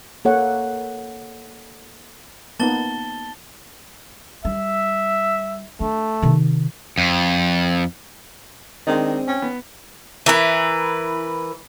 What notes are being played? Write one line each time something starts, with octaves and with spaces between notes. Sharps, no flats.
A#3 A4 C#5 F#5
A#3 B3 D#4 A5 A6 G7
G3 E5
A3 D4
C3 D#3
F2
D#3 G#3 C4 D4 D#5
C#4 G5
B3
E3 A#4 B4